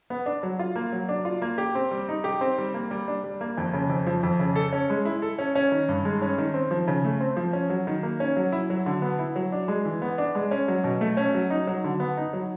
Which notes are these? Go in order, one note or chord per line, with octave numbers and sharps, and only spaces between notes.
B3
D4
F#3
F4
A#3
F#3
D4
F4
A#3
G4
C4
G3
D#4
G4
C4
G3
A#3
G3
D4
G3
A#3
F2
C#3
F2
F3
F2
C#3
A4
C#4
G#3
E4
A4
C#4
C#4
D#3
G2
G#3
C#4
D#3
C4
F3
C#3
A3
C4
F3
C#4
F#3
D#3
A#3
C#4
F#3
E4
F#3
D3
B3
E4
F#3
D4
G#3
E3
B3
D4
G#3
C#4
F#3
B2
A3
C#4
F#3
D#4
F#3
D3
B3
D#4
F#3